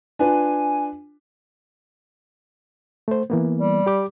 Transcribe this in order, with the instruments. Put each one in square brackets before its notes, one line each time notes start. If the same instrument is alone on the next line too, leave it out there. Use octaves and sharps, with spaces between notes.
[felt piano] D4 F4 B4 [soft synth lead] G#5
[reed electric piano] A3 C5
E3 A#3 B3
[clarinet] G3
[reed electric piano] G4 D6